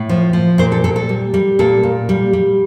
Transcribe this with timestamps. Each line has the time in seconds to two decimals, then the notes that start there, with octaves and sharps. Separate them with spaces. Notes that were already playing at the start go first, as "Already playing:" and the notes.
Already playing: A2
0.09 F3
0.33 F3
0.58 A#2 C5
0.72 A4
0.84 A#2 A4
0.96 A4
1.09 G3
1.34 G3
1.59 A#2 A4
1.83 A#2
2.09 G3
2.33 G3